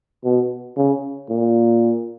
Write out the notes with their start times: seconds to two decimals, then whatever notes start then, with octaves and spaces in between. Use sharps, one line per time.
0.24 B2
0.76 C#3
1.29 A#2